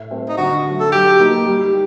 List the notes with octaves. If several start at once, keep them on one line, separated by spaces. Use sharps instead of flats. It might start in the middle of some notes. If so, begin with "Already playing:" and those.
Already playing: A2
A3 C4
D#4
D3 F#4
F#3 A3
A4
F#3 G4
A#3 D#4 F#4 A#4
G3